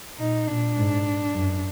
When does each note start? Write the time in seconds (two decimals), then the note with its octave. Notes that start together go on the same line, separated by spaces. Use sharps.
0.19 A#2 D#4
0.48 A#2 D4
0.77 G#2
1.34 F#2